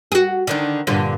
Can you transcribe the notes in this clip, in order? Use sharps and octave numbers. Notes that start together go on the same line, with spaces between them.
F#4 G#4
D3 D#3 D4
G2 A#2 D3